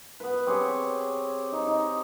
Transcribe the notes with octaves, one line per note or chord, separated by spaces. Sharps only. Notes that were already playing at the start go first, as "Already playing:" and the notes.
B3 B4
C4 G4 G#4 C#5
D#4
D#4